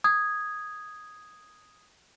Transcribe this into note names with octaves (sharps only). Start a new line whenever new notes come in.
D#6 G#6